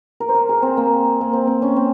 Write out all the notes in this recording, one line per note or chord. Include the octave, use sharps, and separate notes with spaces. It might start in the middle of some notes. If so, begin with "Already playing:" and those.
A#4
C5
A#4
G#4
C4
A#3
A#3
C4
C4
C#4
C4